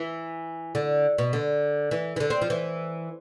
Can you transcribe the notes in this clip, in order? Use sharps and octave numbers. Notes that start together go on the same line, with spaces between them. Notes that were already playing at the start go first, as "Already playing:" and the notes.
Already playing: E3
D3
B2
D3
E3
E3
D3
C4
F3
E3